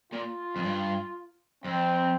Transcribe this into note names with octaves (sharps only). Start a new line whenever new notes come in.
A#2 F4
F2
G2
F2 C4